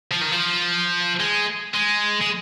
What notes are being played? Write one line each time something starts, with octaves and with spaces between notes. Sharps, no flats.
F3
D#3
F3
G#3
G#3
G#3